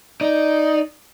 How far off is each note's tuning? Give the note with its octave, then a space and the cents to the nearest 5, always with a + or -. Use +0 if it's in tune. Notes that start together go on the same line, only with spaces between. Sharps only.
D#4 +0 D5 +0